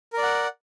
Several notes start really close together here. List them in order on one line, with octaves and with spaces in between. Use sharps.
A#4 D5 F#5